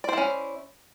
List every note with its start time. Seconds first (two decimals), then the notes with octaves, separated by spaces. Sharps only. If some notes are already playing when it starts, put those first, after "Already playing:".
0.04 D5
0.09 C5
0.13 E4
0.18 C#4